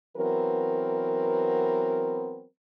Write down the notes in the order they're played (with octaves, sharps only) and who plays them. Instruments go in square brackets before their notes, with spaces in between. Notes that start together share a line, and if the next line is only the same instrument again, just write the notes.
[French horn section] E3 F#3 B3 C4 A#4